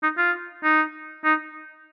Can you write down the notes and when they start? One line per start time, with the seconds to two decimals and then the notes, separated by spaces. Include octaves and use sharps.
0.03 D#4
0.18 F4
0.64 D#4
1.24 D#4